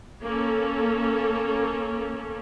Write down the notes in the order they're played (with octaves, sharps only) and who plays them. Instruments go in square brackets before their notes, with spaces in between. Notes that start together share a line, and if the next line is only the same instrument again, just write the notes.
[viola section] A#3 C#4 A4